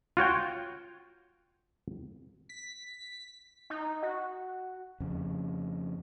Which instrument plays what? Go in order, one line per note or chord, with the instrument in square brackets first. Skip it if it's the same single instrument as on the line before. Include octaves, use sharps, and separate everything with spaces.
[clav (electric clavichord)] F4 F#4 C#5 G5
[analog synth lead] B6
D#4
F#4
[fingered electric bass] F2 C#3